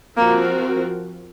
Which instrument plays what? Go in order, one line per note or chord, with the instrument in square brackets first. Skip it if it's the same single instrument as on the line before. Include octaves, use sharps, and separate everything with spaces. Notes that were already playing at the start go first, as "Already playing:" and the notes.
[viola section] F3 C4 F#4 A#4 [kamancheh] A#3